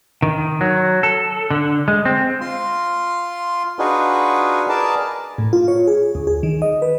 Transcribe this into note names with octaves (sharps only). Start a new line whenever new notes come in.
D#3
F#3
A4
D3
G#3
C4
F4 C6
D4 D#4 F4 F#4 G#4 B4
G#4 A#4 B4 D5 A5
A2
F4
C#5
G#4
D2
G#4
D#3
D#5
B4